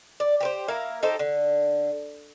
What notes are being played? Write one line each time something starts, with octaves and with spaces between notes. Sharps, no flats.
D5
G4 B4 C5
A#3 E4 A#4 F5
D#4 G4 A4 C5
D3